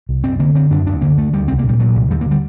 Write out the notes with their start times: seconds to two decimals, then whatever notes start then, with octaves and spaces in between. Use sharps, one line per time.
0.09 C2
0.24 F#2 C4
0.39 D3 A#3
0.55 D3 C4
0.71 F#2 D4
0.86 D2 D4
1.01 D3 A#3
1.18 D3 A3
1.33 D2 G3
1.48 C2 C4
1.59 A#3
1.64 A#2 G3
1.80 A#2 F#3
1.95 C2
2.10 D#2 G3
2.21 A#3
2.26 D3 G3